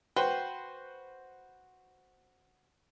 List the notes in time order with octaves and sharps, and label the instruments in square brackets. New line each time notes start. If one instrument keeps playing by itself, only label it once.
[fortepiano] F#4 B4 C5 [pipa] G5